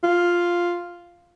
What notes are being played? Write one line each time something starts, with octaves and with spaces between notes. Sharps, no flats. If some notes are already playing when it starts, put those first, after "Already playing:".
F4